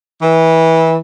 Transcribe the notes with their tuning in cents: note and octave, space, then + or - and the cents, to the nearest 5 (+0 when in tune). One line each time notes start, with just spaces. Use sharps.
E3 -20